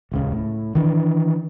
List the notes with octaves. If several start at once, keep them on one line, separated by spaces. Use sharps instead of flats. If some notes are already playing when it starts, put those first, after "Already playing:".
D#1 C#2 C#3
A2
D#3 E3 D4